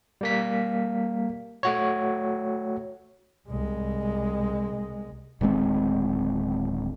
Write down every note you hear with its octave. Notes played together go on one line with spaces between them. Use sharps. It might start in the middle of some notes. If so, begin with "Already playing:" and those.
G3 A#3 B6
A3 F#4 C#5
C2 G#3
D1 D#3 G#3 C4